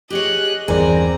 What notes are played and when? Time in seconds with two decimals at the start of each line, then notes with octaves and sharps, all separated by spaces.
0.10 G4 G#4 C#5 D#5 F#6
0.68 G1 E2 C4 G#4 A#4 D5 G#5 A#5